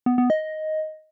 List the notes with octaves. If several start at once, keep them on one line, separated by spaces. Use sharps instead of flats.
B3
B3
D#5